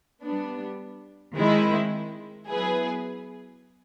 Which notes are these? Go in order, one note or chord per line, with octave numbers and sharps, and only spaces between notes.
G3 B3 D4
D#3 G#3 C4 E4
F#3 B3 E4 G#4 B4